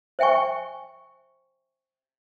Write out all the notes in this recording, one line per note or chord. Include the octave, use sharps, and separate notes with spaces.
C5 E5 G5 G#5 C#6